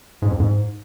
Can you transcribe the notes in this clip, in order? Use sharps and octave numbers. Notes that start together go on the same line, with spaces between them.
G#2
F2
G#2